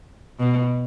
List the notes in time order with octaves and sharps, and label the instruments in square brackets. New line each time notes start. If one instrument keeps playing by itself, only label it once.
[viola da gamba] B2